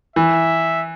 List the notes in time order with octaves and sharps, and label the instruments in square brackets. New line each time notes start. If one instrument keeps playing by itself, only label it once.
[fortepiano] E3 [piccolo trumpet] E5